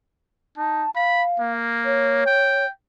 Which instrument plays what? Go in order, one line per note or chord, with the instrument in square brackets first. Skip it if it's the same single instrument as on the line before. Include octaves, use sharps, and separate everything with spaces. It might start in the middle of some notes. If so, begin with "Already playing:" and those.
[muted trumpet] D#4 [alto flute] A5
[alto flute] F5 [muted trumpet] B5
[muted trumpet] A#3
[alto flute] C#5
[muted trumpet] G5